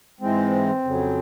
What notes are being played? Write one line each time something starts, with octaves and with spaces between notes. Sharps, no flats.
G#2 E3 G#3 C4
F2 C#3 F#3